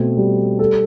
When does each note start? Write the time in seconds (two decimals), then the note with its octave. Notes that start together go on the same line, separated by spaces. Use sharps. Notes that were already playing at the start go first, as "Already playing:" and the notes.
Already playing: B2 A3 C4
0.17 G3
0.59 A4